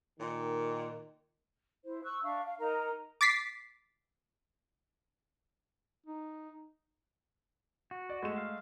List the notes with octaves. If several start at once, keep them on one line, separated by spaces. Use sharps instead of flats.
A#2 D#3
E4 C5
C#6 E6 F#6
D4 E5 F5 C#6
F5
D#4 A#4 A#5
D6 A6 B6 C7
D#4
F#4
D5
G#3 A3 E7
F5